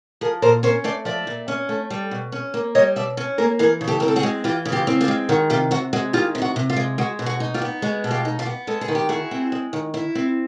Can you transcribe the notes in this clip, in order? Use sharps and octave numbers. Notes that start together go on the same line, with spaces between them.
F3 G#4 A#4
A#2 A#4 C5
C#4 A#4 C5
A3 C5 D5
F3 D5 E5
A#2
C#4
A3
G3
B2
C#4
A#3
G3 C#5 D#5
B2 D5 E5
C#4
A#3 G#4 A#4
E3 G#4 A#4
C#3
G4 A4
C4 A#4
A4
F#4 G#4
G#3
E3 F4 G4
C#3
F4 G4
C4
F4 G4
G#3
D#3 F#4
C3 F4 G4
C3 F#4
G#3 F#4
D#3 F4 G4
C3
F#4
C3
F4
G#3
G#3 F#4
B2
F#4
D#4
F4 G4
B3
G#3 F#4
B2
F4 G4
D#4
F4 G4
B3
G#3 A4
G#4
D#3
G4
E4 F#4 G#4
C4
G#3
D#3
E4
C4